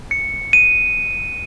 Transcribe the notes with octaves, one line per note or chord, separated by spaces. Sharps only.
C#7
D#7